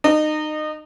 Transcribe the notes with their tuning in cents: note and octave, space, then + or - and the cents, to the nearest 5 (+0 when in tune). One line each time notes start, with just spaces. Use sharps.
D#4 -25